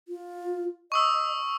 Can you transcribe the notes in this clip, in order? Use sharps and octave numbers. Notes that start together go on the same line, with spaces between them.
F4
D#5 C#6 D#6 E6